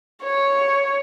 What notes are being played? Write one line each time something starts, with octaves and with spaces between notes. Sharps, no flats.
C#5